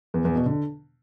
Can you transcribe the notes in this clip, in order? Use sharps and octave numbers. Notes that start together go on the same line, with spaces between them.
E2
E2
B2
D3